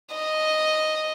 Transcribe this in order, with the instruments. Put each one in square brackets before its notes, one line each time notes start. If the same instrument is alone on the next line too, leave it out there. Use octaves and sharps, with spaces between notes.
[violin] D#5